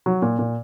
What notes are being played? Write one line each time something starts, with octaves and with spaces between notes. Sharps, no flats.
F#3
A#2
A#2